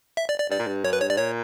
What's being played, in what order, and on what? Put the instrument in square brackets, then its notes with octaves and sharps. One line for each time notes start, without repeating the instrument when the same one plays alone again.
[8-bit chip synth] E5
D5
D5
[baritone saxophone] G2 [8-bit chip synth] D5
[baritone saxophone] A#2
G2
[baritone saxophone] F#2 [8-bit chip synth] C#5
[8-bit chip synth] B4
[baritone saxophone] G2 [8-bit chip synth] C#5
[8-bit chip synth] D5
[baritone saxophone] A#2 [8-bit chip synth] C#5